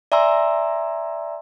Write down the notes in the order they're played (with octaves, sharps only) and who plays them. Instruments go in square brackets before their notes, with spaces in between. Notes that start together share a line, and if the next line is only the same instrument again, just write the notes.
[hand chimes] D5 E5 G#5 A#5 C6 E6